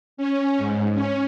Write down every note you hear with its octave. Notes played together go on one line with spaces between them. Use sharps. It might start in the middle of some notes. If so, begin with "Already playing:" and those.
C#4
G#2
C#4